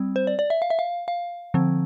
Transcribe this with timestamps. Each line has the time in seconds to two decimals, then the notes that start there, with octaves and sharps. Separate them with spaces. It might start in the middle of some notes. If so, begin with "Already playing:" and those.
Already playing: G3 C4
0.16 C5
0.27 D5
0.39 D5
0.50 E5
0.62 F5
0.70 E5
0.79 F5
1.08 F5
1.54 D3 F3 C4